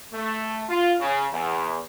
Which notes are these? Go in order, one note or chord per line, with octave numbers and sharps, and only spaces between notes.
A3
F4
C#3
E2